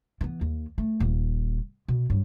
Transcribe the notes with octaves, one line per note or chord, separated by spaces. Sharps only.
E3 B3
D#2
A3
D#1 A#2
B2
G2 F#3